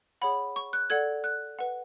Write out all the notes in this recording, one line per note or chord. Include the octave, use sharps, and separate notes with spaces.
G#4 C#5 F#5 B5
C#6
F#6
A4 D5 F#5 G#6
F#6
B4 F#5